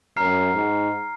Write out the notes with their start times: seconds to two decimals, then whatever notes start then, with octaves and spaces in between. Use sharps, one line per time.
0.17 F#2 A#5 F6 C7
0.54 G#2